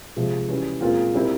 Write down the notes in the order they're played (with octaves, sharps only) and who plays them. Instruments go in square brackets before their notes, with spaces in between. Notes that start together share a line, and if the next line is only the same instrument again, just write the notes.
[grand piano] C3 F3 G#3
E3 G3 C#4
A#2 G#3 C4 F4 A#4
G3 C4 E4 A#4